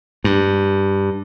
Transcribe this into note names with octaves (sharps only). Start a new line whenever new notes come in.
G2